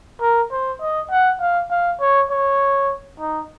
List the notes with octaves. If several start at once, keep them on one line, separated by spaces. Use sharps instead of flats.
A#4
C5
D#5
F#5
F5
F5
C#5
C#5
D#4